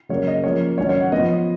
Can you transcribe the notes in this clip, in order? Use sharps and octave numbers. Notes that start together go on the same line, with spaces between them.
C#3 F#3 A#3 C#5
D#5
F3 A#3 C#4 C#5
D#3 F#3 C#4 C#5
C#5
F#5
F3 B3 D#5